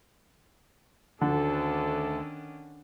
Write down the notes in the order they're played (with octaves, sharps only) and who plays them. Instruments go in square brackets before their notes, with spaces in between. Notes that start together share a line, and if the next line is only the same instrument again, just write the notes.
[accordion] D2 [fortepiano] D3 [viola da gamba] D#3 C#4 D4 [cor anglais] A4